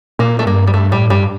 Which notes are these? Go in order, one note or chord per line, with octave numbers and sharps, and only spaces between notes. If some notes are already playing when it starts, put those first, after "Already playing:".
A#2 A#3
A3
G2 A#3
G3
G2 A3
A2 G3
G2 G3